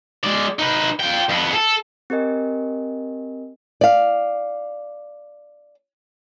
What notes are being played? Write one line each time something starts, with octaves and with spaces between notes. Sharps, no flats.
G#3 D5
D#4 B4
F4 G5
F2 B3
G#4 A4
C4 G4 A#4 D#5 G#5
D5 F5